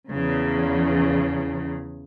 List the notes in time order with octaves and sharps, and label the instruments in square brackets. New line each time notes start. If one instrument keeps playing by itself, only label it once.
[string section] E2 C#3